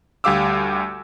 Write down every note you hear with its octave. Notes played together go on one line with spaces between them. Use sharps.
D2 G3 G4 F5 D6 E6